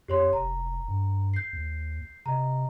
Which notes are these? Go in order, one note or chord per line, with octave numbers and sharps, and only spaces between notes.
F2 G4 C#5 C6
F1 A#5
G2
G6 C7
D#2
C3 D#5 A#5